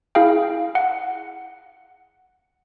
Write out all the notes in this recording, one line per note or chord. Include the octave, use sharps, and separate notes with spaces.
E4 G#4 F5 G5
F#5